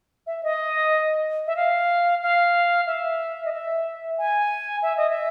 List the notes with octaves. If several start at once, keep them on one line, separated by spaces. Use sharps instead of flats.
E5
D#5
E5
F5
F5
E5
D#5
E5
G#5
E5
D#5
E5